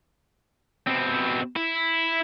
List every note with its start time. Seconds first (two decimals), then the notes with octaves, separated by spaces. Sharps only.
0.87 B2 C4
1.56 E4